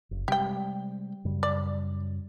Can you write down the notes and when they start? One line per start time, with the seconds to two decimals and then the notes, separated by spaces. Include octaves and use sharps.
0.11 F#1
0.28 C3 G3 G#3 G4 G5
1.25 F#2 C#3 G3
1.43 D5